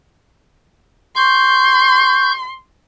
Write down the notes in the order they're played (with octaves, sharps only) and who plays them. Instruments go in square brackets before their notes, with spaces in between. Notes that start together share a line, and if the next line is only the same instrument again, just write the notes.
[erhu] C6 [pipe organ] C#6 G6